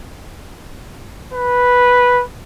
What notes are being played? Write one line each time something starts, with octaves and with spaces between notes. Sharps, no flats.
B4